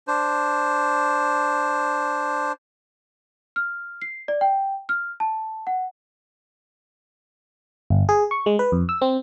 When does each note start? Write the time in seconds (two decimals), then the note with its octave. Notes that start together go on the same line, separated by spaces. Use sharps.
0.08 D4 C5
3.56 F6
4.02 C7
4.28 D5
4.41 G5
4.89 F6
5.20 A5
5.67 F#5
7.90 G1
8.09 G#4
8.31 C#6
8.46 G#3
8.59 B4
8.72 F2
8.89 E6
9.02 C4